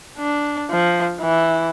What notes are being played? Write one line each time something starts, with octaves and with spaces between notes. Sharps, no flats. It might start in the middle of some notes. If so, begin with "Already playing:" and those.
D4
F3
E3